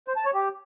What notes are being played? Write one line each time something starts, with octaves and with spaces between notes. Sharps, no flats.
C5
A5
C#5
G4